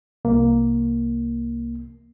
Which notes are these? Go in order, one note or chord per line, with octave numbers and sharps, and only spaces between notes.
C2 A#3